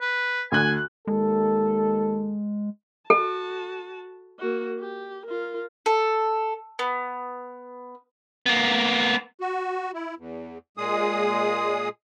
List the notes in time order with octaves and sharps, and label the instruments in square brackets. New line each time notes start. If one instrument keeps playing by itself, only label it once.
[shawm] B4
[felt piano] D2 F#6 [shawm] G#5
[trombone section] D#2 A4 [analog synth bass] G#3
[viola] F#4 A5 [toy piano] A4
[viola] A#3 F#4
G4
F4 A#4
[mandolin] A4
B3
[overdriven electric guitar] A#3 B3
[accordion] F#4
E4
E2
A#2 G#3 G#4 D#6